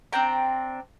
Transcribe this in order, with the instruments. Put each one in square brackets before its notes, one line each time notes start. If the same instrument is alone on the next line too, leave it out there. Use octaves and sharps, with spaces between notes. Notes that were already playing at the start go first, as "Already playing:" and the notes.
[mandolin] C4 D4 G5 A#5